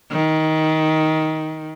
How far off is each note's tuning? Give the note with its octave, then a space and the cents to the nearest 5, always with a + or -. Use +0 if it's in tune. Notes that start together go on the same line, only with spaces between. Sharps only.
D#3 +15